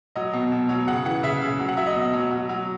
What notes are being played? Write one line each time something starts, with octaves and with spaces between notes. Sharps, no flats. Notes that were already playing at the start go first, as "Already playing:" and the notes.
F#3 D#5
B2
B2
F#3
C#3 F#5
E3 F#5
C#3 E5
C#3
F#3
F#5
F#3 E5
D#5
B2
F#3
F#3
F#3